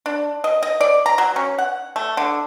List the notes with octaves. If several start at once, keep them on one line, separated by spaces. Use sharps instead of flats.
D4
D#5
D#5
D5
A#5
F#3
C#4
F#5
A3
D3